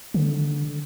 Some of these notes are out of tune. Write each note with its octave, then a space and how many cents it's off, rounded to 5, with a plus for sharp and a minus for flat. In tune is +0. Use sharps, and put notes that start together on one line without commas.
D3 -5